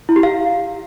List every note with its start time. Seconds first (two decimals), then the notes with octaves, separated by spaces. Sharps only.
0.09 E4
0.16 G4
0.23 F5